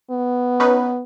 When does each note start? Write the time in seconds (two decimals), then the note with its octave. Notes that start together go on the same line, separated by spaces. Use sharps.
0.11 B3
0.60 C#4 D#4 B4